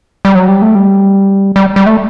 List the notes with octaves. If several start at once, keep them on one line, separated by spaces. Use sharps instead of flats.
G3
F#3
G3
A3
G3
G3
G3
A3